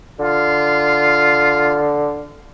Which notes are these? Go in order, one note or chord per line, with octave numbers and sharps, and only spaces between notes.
D3 F4